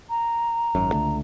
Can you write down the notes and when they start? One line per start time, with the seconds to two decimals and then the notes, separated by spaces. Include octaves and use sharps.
0.10 A#5
0.75 G#1 F#2
0.93 C#2 D3 A3